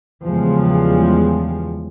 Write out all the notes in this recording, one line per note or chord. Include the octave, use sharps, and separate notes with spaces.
E2 C#3 F3 G3 G#3